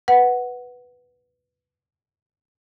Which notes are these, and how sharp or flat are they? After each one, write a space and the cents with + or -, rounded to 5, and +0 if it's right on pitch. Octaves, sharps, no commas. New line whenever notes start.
B4 +0 F#5 +0